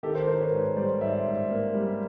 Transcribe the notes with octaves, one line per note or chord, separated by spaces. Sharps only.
D#3 G4 A4
A#4 C5
D#3 A#4 C5
B4 C#5
G#2 B4 C#5
G3 C5 D5
G#2 D5 E5
G#2
A#3
G3